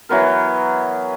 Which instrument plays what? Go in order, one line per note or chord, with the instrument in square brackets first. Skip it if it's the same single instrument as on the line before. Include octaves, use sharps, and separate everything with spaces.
[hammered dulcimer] E3 F#3 B3 A#4